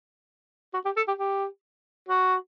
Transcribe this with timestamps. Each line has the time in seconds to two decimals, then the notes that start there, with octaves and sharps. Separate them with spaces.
0.74 F#4
0.85 G4
0.97 A4
1.08 G4
1.19 G4
2.09 F#4